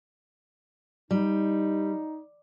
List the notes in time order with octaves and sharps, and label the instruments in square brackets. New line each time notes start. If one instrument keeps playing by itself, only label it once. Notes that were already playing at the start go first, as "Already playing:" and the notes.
[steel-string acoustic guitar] G3 [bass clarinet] D#4